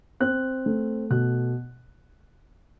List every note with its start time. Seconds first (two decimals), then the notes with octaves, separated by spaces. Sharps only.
0.20 C4 F#6
0.66 A3
1.10 B2 F#6